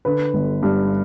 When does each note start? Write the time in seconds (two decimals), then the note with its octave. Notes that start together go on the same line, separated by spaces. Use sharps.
0.05 D3 B4
0.34 G1
0.63 G2